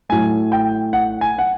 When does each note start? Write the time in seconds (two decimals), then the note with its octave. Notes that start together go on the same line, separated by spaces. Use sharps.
0.09 A2 F#3 A3 G#5
0.52 G5
0.93 F#5
1.21 G#5
1.39 F#5